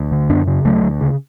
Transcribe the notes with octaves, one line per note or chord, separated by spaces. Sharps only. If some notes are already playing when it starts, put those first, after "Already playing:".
Already playing: D2
D3
F#2 B3 D4
C#3
D2 F#3 A3
D2
C#3